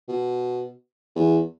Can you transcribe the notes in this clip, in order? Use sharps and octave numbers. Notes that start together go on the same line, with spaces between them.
B2
E2